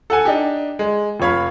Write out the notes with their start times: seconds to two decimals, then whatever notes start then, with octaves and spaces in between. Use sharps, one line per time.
0.10 A4 F#5 G#5
0.25 D4 D#4 G4
0.79 G#3
1.20 F1 F3 C#5 F5 B5